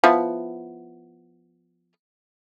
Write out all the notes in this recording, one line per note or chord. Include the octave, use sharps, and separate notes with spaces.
F3 B3 E4